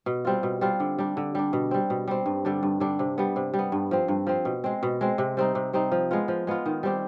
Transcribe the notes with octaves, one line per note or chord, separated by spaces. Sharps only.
B2
G3 C4 F4
B2
G3 C4 F4
D3
G3 D4
D3
G3 D4
B2
G3 C4
B2
G3 C4
G2
D3 G3 D4
G2
D3 G3 D4
C3
G3 B3
C3
G3
B3
G2
F3 C4
G2
F3 C4
B2
G#3 C4
B2
G#3 C4
C3
G3 C4 D#4
C3
G3 C4 D#4
F3
G#3 B3 F4
F3
G#3 B3 F4
D#3
G3 C4 G4